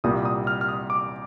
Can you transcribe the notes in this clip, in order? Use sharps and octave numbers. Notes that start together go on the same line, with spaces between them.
C2 A#2 G3 A#3 D#6
D#6
F6
F6
D#6
D6